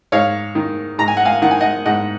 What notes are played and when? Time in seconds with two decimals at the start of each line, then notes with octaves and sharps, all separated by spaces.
0.12 G#2 C#5 F5
0.55 D#3
0.98 G#2 A#5
1.08 G#5
1.17 F#5
1.25 F5 G#5
1.42 D#3 F#5
1.51 G#5
1.61 D#5 F#5
1.85 G#2 D#5 F#5